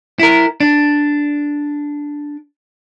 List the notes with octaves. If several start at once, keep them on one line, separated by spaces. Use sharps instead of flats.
E4 A#4
D4